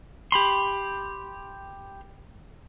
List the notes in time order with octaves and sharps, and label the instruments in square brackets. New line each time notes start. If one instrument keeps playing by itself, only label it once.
[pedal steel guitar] G4 B5 C6